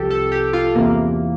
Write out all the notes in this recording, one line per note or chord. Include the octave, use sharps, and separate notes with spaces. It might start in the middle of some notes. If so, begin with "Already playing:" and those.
Already playing: C2 C3 F3 G4 A4
A4
G4
F4
E2 C3 E3 A#3